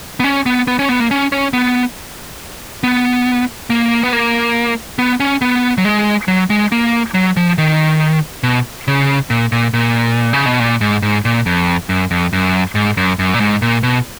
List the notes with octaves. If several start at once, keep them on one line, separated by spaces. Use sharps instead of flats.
B3
C#4
B3
B3
C#4
B3
A#3
C#4
C#4
B3
B3
A#3
B3
A#3
B3
C#4
B3
F#3
G#3
F#3
G#3
A#3
F#3
F3
D#3
B2
C#3
A#2
A#2
A#2
C#3
B2
A#2
G#2
G#2
A#2
F2
F#2
F2
F#2
G#2
F#2
F#2
A#2
G#2
A#2
B2